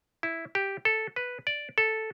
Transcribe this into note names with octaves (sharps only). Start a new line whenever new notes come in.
E4
G4
A4
B4
D5
A4